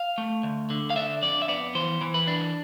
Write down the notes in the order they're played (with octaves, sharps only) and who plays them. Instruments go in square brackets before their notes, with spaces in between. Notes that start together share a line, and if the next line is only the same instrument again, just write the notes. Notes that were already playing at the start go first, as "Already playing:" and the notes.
Already playing: [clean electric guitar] F5
A3
D2
D3
F5
D4 E5
F2 D5
E5
B3 D5
E3 C5
E3
B4
D4